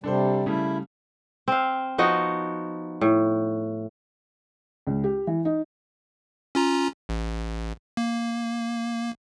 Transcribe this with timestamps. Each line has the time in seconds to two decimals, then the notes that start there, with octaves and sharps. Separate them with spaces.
0.04 C3 G3 D4 A4 C5
0.46 C#3 G3 A3 E4
1.48 C4 F5
1.98 F3 B3 D#4 F#4
3.01 A2
4.87 C#2
5.04 G4
5.27 E3
5.45 D#4
6.55 C#4 F4 A#5
7.09 A1
7.97 A#3